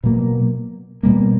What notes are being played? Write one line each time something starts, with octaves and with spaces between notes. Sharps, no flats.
B2 F#3 A#3
B2 G3 A#3